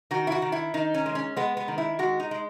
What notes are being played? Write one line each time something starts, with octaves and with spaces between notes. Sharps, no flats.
D#3 F#4
E4
F#4
D#3
E4
D#3 D#4
C#4
G#3
C#4
G#3 B3
B3
D#3
E4
G#3 F#4
D#4
G#3